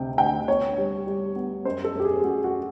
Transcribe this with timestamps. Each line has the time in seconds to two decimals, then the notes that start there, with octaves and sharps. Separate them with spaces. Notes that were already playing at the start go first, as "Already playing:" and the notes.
Already playing: D2 C3 G5
0.18 D2 G5
0.48 B3 C#5
0.78 G3
1.07 G3
1.36 B3
1.65 F#2 C5
1.84 A4
1.95 F#2 G4
2.05 G#4
2.24 F#2 F#4
2.44 F#4